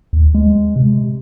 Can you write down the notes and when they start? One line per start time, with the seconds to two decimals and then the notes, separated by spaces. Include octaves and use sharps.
0.13 D#2
0.35 G#3
0.76 C3